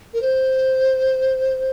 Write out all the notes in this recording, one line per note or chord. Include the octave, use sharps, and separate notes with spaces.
A#4
C5